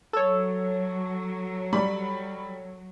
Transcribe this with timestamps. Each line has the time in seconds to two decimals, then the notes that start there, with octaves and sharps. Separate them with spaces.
0.13 F#3 A4 C#5
1.73 G3 B5